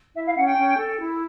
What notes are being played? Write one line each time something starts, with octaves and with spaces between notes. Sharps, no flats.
E4 E5
F5
C#4 F#5
G5
C#4
A4
E4